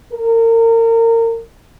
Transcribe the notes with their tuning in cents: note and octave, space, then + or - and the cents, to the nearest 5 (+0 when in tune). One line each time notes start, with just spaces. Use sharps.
A#4 -30